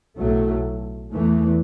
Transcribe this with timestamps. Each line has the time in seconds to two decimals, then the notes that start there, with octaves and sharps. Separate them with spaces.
0.17 B1 A2 F#3 A3
1.11 E2 E3 A3